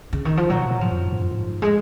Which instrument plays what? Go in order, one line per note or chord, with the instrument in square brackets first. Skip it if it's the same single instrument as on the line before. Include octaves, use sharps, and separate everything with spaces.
[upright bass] C#3
D#3
F3
[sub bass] A#2 [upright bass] F#3
[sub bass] C3
A#2
[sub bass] G#2 [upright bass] F3
[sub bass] F2
F#2
G#2
F#2
G#2
[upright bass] G#3